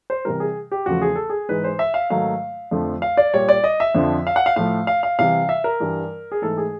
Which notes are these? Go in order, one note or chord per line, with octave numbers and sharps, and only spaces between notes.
C5
C3 E3 G3 A#4
G#4
G4
E2 C#3 F3 A3 F#4
G#4
A4
G#4
G#2 E3 G#3 B4
C5
E5
F5
G#2 D#3 F#3 A3 F5
F2 D3 F3 A3
F5
D5
A#2 G3 C#5
D5
D#5
E5
F2 D3 F3
F5
F#5
F5
A2 F3 A3 F5
F5
F5
C3 E3 G3 F5
E5
A#4
G2 E3 G3
G#4
G#2 E3 A3 A4
G#4